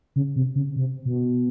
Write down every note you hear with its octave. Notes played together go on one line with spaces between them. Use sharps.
C#3
C3
C#3
C3
B2